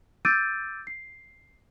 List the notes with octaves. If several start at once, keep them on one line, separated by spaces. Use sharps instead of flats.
D6 E6 G6 A6 D7 D#7
C7